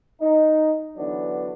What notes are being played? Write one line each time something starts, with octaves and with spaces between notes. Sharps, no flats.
D#4
D3 E3 F#3 B3 D4